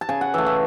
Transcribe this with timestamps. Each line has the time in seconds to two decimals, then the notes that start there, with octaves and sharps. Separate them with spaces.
0.01 A5
0.09 C#3 G#5
0.21 F#5
0.34 E3 A3 E5
0.46 E5